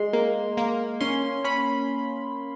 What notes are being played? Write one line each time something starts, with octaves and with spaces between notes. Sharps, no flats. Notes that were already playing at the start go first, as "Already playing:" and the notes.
Already playing: G#3 C6
A#3
A#3
C#4 C6
C#4 B5